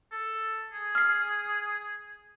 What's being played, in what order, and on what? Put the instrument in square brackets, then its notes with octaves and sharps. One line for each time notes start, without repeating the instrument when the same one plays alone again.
[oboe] A4
G#4
[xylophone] F6 C7